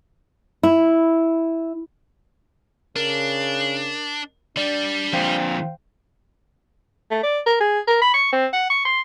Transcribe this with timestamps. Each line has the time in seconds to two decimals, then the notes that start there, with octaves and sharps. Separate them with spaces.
0.63 E4
2.96 C#3 D4 A#4
4.57 G3 D4 D5
5.13 F2 A#2 C5 F5 G5
7.11 A3
7.23 D5
7.46 A#4
7.60 G#4
7.88 A#4
8.02 B5
8.14 C#6
8.33 C4
8.53 F#5
8.70 C#6
8.85 C6